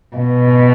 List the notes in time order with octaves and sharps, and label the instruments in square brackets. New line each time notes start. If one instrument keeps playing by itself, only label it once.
[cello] B2